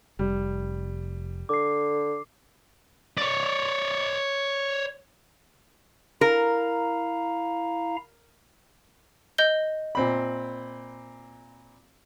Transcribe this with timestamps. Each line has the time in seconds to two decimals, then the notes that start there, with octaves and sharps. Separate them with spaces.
0.19 F1 G3
1.49 D3 D6 C7
3.18 C#5 D5
6.21 E4 A#4 F5 A#5
9.38 D#5 G6 G7
9.95 A#2 C4 B5